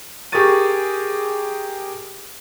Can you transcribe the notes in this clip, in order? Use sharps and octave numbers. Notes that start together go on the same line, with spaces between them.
G4 G#4 A#4 C#6 A6 D#7